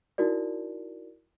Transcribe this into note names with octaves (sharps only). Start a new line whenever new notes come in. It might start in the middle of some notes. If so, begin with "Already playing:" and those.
D#4 E4 F#4 A#4 D5